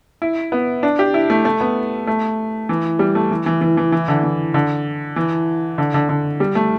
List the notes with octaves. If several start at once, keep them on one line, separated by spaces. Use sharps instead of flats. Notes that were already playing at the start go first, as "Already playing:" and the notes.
E4
B3
D4
G4
E4
A3
A3
B3
A3
E3
G3
A3
E3
E3
E3
E3
E3
D3
E3
D3
E3
D3
D3
D3
G3
A3